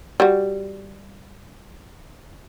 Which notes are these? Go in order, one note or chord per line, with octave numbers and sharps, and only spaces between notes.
G3 F#4